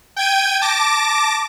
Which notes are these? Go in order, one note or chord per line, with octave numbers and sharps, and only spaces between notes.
G5 G#6 D#7
A5 D6 A#6